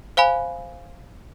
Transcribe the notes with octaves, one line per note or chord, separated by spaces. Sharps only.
C5 F5 G#5 B5